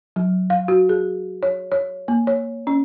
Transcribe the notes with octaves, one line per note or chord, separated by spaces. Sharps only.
F#3
F5
F#4
G#4
C#5
C#5
A#3
C#5
C#4